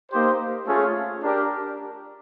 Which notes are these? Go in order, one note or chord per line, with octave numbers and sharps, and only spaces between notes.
A#3 D#4 G4 C5
A3 C#4 F4 G#4
D4 G4 A#4 D5